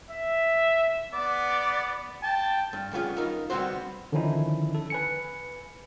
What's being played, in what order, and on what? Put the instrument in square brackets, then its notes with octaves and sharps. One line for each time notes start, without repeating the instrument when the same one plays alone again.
[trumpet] E5
[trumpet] B3 [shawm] D5
[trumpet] G5 [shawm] A5
[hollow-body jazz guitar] G2
G3 B3 C#4 F4 G#4
D#4 F4 A#4
D3 G3 B3 C4 F#4 C5
[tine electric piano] D3 D#3 F3 C#4 D#4 E4
A4
B4 G#5 C#7